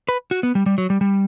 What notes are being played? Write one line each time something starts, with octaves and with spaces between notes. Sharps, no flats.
B4
F#4
B3
G3
G3
F#3
G3
G3